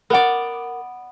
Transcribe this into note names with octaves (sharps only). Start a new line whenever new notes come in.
B3 A#4 D5 F#5